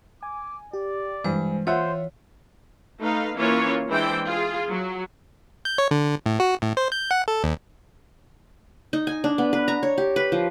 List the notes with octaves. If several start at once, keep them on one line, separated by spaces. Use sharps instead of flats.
G#5 D6
G4 D5
G2 E3 G#3 C5
F4 C5 C#5 E5 F#5
A3 D#4 B4 F5
E3 A#3 C#4 F4 B4 C#5
E3 G#3 D4 E4 C5 G5
F4 G#4
F#3
G6
C#5
D3
A2
F#4
A2
C5
G6
F#5
A4
D#2
D#4
G#5
D4
B3
B4
A#5
C#5
G4
B4
F3